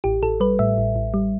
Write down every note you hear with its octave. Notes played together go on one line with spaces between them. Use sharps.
A1 G4
A1 A4
G3 B4
A2 E5
A1
A1
G3